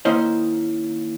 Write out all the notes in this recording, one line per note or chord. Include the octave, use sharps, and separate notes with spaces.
D#3 A#3 C#4 E4 C5 D#5